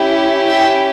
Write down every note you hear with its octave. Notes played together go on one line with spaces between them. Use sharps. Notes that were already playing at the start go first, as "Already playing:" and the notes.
Already playing: C#4 E4 G4
E5 G5